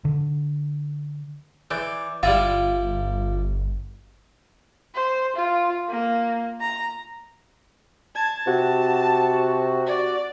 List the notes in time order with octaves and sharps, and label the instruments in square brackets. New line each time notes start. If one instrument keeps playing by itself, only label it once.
[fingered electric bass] D3
[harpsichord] E3 [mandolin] D5 G6
[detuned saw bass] G1 [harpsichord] G3 E4 E5 [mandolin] F4
[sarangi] C5
F4
A#3
A#5
[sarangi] A5 [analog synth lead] G#6
[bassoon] C3 [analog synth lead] F#4
[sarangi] D5